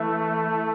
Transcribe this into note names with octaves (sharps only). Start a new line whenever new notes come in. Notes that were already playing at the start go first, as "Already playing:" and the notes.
Already playing: E3 A3